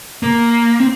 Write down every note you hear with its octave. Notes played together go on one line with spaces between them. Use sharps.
A#3
C4